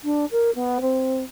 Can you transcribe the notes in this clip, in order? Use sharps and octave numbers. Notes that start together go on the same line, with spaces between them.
D4
A#4
B3
C4